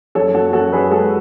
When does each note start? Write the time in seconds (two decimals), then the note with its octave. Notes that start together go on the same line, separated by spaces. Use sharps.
0.15 F#2 A4 C#5
0.34 F#2 F#4 A4
0.53 F#2 F#4 A4
0.72 F#2 G#4 B4
0.91 G#3 F#4 A4